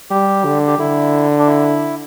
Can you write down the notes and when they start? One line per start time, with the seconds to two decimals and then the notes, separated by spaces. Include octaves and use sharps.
0.10 G3 G4
0.45 D3
0.67 G4
0.79 D3 E4
1.39 D4
1.47 E4